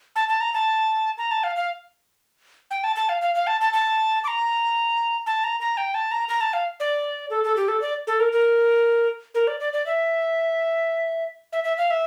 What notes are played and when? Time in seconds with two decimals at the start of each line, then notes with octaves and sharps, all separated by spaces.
0.16 A5
0.29 A5
0.41 A#5
0.54 A5
1.18 A#5
1.31 A5
1.44 F5
1.56 F5
2.71 G5
2.84 A5
2.96 A5
3.09 F5
3.21 F5
3.35 F5
3.47 A5
3.61 A5
3.73 A5
4.24 D6
4.28 A#5
5.26 A5
5.44 A#5
5.60 A#5
5.77 G5
5.94 A5
6.11 A#5
6.29 A#5
6.41 A5
6.53 F5
6.80 D5
7.30 A4
7.44 A4
7.57 G4
7.68 A4
7.82 D5
8.07 A4
8.20 A#4
8.32 A#4
9.35 A#4
9.47 D5
9.60 D5
9.73 D5
9.86 E5
11.53 E5
11.64 E5
11.78 F5
11.91 E5